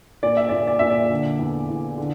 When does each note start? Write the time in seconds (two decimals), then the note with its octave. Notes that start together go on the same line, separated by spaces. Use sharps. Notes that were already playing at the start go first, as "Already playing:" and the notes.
0.23 A#2 D5
0.37 E5
0.49 A#2 D5
0.67 D5
0.79 A#2 E5
0.90 D5
1.10 D3
1.39 E2
1.69 E2
1.98 D3